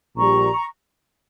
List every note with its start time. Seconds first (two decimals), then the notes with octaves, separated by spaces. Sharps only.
0.16 A#1 A#2 G3 A#5 C#6
0.52 C#6